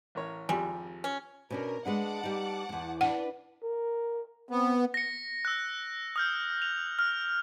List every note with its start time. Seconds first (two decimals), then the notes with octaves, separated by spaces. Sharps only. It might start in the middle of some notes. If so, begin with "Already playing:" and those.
0.15 A1 A#4 C#5
0.49 G#1 F2 G3 G4 G#5
1.04 C#4
1.50 B2 C#4 D4 A#4
1.85 G#3 B3 D4 F#5 A5 D6
2.23 G3 D#4
2.69 E2 G2
3.01 D4 B4 F#5
3.63 A#4
4.51 B3 C4
4.94 A#6 C#7
5.45 E6 F#6
6.16 D#6 F6 G6
6.62 F7
6.99 F6